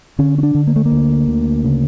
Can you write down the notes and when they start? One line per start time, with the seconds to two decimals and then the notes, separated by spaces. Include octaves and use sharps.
0.19 D3 C#4
0.38 C#4
0.43 D4
0.55 D3
0.67 A#3
0.76 A3
0.85 A#3
0.92 D2
1.28 D2
1.64 C#3